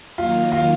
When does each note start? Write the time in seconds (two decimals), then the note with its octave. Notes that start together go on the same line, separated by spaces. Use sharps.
0.18 D#3 F#3 A#3 D#4 F4
0.52 F4